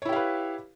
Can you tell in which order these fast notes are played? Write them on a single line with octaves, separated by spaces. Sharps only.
C#5 E4 G4 F5 B4